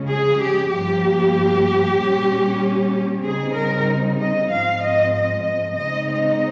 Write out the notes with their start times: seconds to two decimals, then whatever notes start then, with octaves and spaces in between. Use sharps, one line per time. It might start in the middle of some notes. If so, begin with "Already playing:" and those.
Already playing: C#3 F3 G#3 C#4
0.10 G#4
0.41 G4
0.72 G2 F3 A#3 G4
1.99 A#2 G3 C#4
3.24 C#3 G3 C4 D#4 G#4
3.56 A#4
4.18 D#5
4.50 G#2 F3 C4 F5
4.82 D#5
5.14 D#5
5.44 D#5
5.76 C#3 G#3 C4 D#4 D#5
6.08 D#5